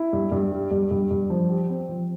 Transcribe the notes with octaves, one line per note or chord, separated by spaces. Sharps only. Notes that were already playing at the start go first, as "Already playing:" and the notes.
Already playing: E4
G2
G2
G3
G2
G2
G2
F3
G4
C4
F3